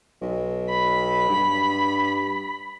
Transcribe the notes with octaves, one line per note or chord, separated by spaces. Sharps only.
B1
B5
G2